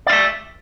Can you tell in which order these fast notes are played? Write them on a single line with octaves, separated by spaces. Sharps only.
D5 F5 E5